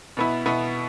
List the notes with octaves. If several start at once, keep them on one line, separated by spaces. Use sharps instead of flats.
B2 B3 E4
B2 B3 E4